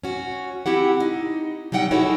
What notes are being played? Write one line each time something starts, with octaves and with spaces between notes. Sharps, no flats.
C#4 F#4
C4 E4 G4 F#5
D#4
F#3 G3 D#4 F#5 G5
D#4 E4 F#4 G#4 A4 C#5